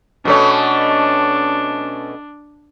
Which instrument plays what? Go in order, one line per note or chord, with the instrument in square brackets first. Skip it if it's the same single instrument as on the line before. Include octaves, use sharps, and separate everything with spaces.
[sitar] B2 A3 C#4 [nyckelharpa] D4